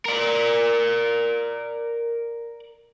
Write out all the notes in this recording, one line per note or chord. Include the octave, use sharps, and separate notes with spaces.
A#4 D5